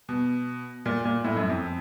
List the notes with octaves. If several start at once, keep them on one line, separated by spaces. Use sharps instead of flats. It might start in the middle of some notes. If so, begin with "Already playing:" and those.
B2
A#2
A#2
A2
F#2
F2